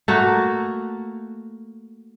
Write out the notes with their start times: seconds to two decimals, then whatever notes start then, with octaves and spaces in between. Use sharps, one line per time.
0.08 A3 A#3 F#4